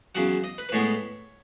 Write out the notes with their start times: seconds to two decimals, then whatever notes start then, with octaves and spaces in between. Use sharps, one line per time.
0.15 E2 C#3 F#3 F#5
0.44 D#5
0.58 B4
0.69 B4
0.72 A2 G#3 B3 C#5